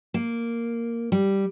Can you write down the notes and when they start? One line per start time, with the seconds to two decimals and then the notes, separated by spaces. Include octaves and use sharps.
0.14 A#3
1.12 G3